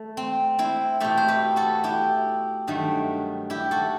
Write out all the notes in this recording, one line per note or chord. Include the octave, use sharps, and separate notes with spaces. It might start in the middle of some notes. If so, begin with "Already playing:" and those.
Already playing: A3
C4
C4 E4
B2 A3 E4 G4
C5
G4 B4
F#4 A4
E4 G4
G2 D#3 F#3 A3
E4 G4
F#4 A4